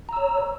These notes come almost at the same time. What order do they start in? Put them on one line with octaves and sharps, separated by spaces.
A#5 E6 C#5